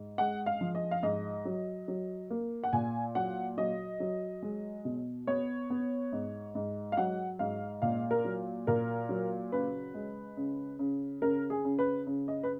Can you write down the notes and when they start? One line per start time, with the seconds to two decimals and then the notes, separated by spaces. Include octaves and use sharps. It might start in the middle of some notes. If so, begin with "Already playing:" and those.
Already playing: G#2
0.18 G#3 F#5
0.46 F5
0.61 F3
0.75 D#5
0.91 F5
1.03 G#2 D#5
1.45 F#3
1.88 F#3
2.31 A#3
2.64 F#5
2.73 A#2 G#5
3.15 F#3 F#5
3.57 F#3 D#5
4.00 F#3
4.42 G#3
4.85 B2
5.27 B3 C#5
5.70 B3
6.13 G#2
6.55 G#2
6.92 F5
6.97 F#3 F#5
7.39 G#2 F5
7.82 A#2 F5
8.11 A#4
8.25 F#3
8.67 A#2 A#4
9.09 F#3
9.52 C#3 B4
9.94 G#3
10.37 C#3
10.79 C#3
11.22 C#3 A#4
11.50 G#4
11.65 C#3
11.79 B4
12.07 C#3
12.28 D#5
12.43 B4